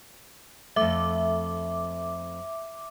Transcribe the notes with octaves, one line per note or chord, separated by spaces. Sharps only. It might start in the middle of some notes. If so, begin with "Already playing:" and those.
F2 A3 E5 D6